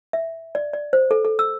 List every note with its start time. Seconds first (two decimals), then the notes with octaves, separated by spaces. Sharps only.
0.13 E5
0.55 D5
0.73 D5
0.93 C5
1.11 A4
1.25 A4
1.39 E6